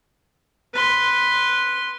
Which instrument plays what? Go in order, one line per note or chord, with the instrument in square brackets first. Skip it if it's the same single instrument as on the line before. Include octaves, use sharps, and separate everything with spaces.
[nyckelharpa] B4 C6